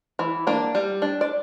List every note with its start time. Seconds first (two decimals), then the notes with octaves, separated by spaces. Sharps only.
0.19 E3
0.47 A#3 D4
0.75 G3
1.02 D4
1.21 D5